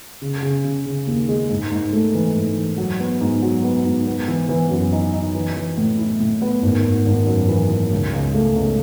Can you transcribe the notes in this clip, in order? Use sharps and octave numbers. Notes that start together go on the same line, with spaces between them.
C#3
C#3
C#3
C#3
D#2
G#3
G#2
G#2
A3
E3
G#2
E3
F#3
B3
G#2
F#3
B3
G#2
B3
E3
E3
F#2
D#4
D#4
E3
E3
A2
E4
A2
B3
G#1
G#1
G#1
F#2
E3
E3
C#2
C#2
A3
C#2